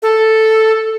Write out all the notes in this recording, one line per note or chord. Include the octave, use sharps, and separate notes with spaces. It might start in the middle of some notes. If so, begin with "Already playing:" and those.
A4